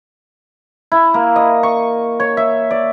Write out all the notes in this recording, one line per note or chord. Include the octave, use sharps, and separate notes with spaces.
E4
A#3
D#5
C#6
C#5
E5
D5